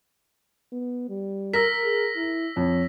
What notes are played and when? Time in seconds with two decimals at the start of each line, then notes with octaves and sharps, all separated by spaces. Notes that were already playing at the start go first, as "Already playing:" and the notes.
0.72 B3
1.09 G3
1.54 A#4 E6 A#6 B6
1.84 G#4
2.16 E4
2.57 F2 C#5